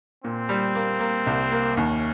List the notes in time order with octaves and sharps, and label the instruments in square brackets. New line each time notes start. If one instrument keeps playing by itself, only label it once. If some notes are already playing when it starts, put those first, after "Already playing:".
[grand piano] A#2 [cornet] C4
[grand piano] G3
A#3
A#3
C2
A#3
[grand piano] D#2 [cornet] C#4